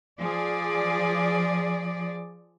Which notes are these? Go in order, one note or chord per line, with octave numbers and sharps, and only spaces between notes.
F3 G#4 D5